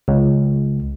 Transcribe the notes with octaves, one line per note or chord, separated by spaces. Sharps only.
C#2